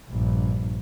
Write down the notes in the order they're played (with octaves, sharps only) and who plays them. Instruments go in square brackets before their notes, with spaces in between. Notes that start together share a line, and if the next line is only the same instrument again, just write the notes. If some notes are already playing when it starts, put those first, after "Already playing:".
[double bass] A#1 G2